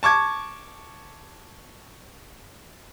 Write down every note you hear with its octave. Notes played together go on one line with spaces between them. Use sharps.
A5 C#6 D6 G#6